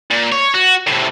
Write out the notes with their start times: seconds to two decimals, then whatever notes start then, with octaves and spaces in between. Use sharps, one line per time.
0.11 A#2
0.32 C#5
0.54 F#4
0.87 A2 C3